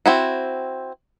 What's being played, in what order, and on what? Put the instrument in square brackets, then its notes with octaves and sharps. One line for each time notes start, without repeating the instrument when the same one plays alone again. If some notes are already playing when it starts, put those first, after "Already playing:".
[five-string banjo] C4 E4 F#4